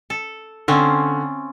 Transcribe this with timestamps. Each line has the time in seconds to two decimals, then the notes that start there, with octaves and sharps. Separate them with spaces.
0.10 A4
0.68 D3 C4 C#4 F4